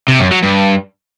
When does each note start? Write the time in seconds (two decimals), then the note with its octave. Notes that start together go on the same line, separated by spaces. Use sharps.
0.08 C3
0.20 F#2
0.31 F#3
0.43 G2